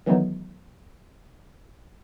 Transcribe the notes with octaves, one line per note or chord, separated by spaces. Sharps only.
D#3 E3 F#3 A3 B3 D#4